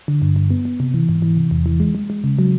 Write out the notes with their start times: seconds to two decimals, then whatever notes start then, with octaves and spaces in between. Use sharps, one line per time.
0.08 D3
0.22 G2
0.36 G2
0.50 B3
0.65 B3
0.80 C3
0.94 E3
1.09 G#2
1.22 E3
1.37 C3
1.51 E2
1.66 E3
1.80 G#3
1.95 G#3
2.10 G#3
2.24 C#3
2.39 F#3